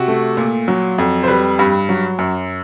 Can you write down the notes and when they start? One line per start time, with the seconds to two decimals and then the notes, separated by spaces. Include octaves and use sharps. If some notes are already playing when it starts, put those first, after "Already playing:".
Already playing: C3 F#4
0.08 A3
0.37 A#2
0.68 F#3
0.98 F2
1.23 C5
1.28 G3 B4
1.59 G2
1.89 F#3
2.19 F#2